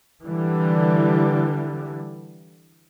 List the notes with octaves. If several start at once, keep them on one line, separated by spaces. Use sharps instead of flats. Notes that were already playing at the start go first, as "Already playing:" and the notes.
D3 E3 G3